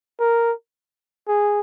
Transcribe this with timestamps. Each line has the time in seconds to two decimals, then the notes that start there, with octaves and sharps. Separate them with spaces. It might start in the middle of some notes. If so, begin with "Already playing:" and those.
0.19 A#4
1.28 G#4